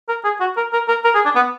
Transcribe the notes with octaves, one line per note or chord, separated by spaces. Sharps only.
A#4
G#4
F#4
A#4
A#4
A#4
A#4
G#4
D4
B3